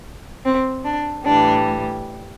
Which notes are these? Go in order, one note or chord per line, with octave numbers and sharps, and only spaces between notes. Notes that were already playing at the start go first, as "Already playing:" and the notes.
C4
D4
A2 E3 G3 D4